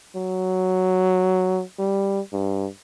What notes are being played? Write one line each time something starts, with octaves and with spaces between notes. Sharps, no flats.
F#3
G3
G2